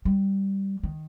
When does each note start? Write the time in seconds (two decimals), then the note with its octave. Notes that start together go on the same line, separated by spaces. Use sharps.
0.05 G3
0.83 D#3